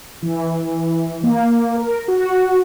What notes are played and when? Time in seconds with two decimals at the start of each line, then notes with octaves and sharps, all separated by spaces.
0.22 E3
1.23 A#3
1.76 A#4
2.08 F#4